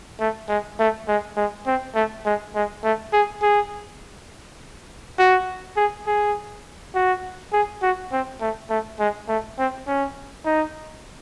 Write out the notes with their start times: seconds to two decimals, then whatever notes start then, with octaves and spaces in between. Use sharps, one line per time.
0.20 A3
0.49 G#3
0.79 A3
1.08 G#3
1.37 G#3
1.67 C4
1.95 A3
2.26 G#3
2.55 G#3
2.84 A3
3.13 G#4
3.42 G#4
5.19 F#4
5.77 G#4
6.07 G#4
6.95 F#4
7.53 G#4
7.82 F#4
8.12 C4
8.41 A3
8.70 A3
9.00 G#3
9.29 A3
9.59 C4
9.88 C#4
10.46 D#4